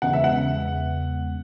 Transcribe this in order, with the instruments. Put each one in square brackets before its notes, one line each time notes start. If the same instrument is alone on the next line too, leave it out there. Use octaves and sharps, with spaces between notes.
[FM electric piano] E2 C#3 G#3 B3 [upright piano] F#5
[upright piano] E5
F#5